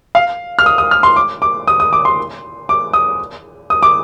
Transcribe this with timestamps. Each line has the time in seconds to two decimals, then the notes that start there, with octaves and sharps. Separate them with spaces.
0.15 F5
0.59 F6
0.66 D#6
0.78 D#6
0.91 F6
1.03 C6
1.16 D6
1.42 D6
1.68 D#6
1.80 D#6
1.93 D6
2.05 C6
2.69 D6
2.93 D#6
3.70 D#6
3.83 D6